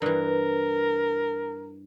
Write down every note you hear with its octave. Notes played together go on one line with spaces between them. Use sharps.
G2 E3 A#4